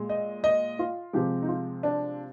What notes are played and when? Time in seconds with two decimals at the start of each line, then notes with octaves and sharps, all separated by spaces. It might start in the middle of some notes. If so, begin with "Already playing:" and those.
Already playing: A#2 G#3
0.09 D#5
0.44 D#5
0.79 F4
1.13 C3 F3 G#3 G4
1.42 D#4
1.48 F4
1.83 D4